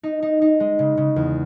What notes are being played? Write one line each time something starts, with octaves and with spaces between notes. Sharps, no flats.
D#4
D#4
D#4
G#3
C#3
C#3
E2